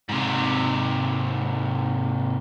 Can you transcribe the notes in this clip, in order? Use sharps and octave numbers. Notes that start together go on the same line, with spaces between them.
G#2 C3